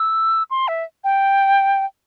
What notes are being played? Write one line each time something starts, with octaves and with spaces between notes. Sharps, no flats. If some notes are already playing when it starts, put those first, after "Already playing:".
Already playing: E6
C6
E5
G5